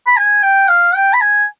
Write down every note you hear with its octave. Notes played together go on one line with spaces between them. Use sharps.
B5
G#5
G5
F5
G5
B5
G#5